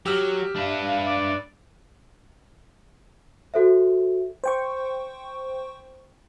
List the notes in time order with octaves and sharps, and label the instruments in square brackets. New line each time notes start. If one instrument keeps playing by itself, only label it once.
[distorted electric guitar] F#3 [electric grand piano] G4 E6 F6
[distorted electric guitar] D4 B4 [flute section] E5 F5
[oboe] D5
[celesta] F#4 A4 C5 E5
[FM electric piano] C5 G5 C#6